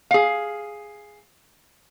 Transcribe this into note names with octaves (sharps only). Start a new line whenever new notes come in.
G#4 F5